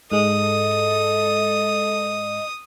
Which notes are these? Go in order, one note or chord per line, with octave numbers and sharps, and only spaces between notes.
G#2 G#3 A4 D#5 D#6